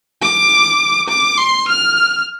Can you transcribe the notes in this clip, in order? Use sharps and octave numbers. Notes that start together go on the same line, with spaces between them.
D6
D6
C6
F6